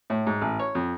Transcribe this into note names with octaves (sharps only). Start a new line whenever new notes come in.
A2
G#2
A1
C#5
F2